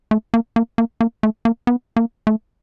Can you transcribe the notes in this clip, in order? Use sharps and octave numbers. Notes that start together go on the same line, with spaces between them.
A3
A#3
A#3
A#3
A#3
A3
A#3
B3
A#3
A3